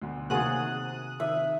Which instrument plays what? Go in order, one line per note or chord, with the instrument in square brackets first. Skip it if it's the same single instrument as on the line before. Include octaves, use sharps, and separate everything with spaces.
[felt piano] D2 B2 D3
[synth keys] C3 D#6 F#6 [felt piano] D#3 A6 [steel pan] A#3 F#4 G#4
[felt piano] D#3 [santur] E5